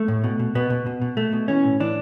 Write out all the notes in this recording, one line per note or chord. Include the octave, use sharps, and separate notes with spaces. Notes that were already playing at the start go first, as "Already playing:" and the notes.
Already playing: A3
A2
B2
B2
B2 B3
B2
B2
B2
B2 A3
B2
E3 C#4
A2
E3 D4